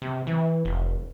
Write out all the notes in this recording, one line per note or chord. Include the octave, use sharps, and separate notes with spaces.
C3
E3
F1